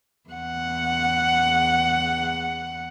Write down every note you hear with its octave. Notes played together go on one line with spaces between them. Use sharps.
E2 F#5